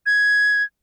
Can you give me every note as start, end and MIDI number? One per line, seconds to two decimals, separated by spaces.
0.06 0.63 92